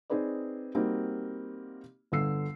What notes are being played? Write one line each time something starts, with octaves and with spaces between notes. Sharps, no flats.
C4 D#4 G#4 B4 D5
G3 A#3 C4 D#4 F#4
G1 D3 E6 C7